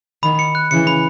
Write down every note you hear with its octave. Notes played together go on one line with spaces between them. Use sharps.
D#3 B5
C#7
F#6
C#3 E3 C#7
B5